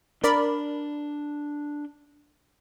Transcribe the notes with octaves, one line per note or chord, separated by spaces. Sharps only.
D4 A#4 D5 B5